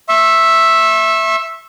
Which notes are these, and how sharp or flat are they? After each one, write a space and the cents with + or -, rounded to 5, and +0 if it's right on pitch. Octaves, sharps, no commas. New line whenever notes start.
E5 +0 C#6 -40